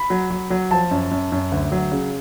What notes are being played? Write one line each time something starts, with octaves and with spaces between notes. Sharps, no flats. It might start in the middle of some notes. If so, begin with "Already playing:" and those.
Already playing: B5
F#3
F#3
F#3
F3 A5
F#2
F#2
F#2
D2
F#3
C#3